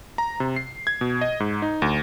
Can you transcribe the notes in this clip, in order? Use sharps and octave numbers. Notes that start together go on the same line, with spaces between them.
A#5
C3
C7
G#6
B2
D#5
G#2
D#4
D2